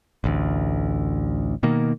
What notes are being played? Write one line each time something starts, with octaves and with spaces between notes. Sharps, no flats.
A1 D2
B2 D#3 A#3